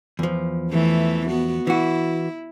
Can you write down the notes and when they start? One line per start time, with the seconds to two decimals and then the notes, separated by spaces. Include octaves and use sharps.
0.19 E2 F3
0.71 E3 A3
1.28 B3 F#4
1.67 E3 E4 F#4